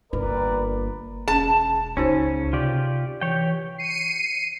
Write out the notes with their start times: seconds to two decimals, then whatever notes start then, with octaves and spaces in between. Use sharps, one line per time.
0.13 G1 A#3 A#4 B4 D5
1.28 E1 C#4 G#4 A5
1.97 C#2 C#3 C#4 D#4 F#4 C5
2.53 C3 F4 G4 D5
3.21 E3 G4 C#5 G5
3.78 C7 C#7 D#7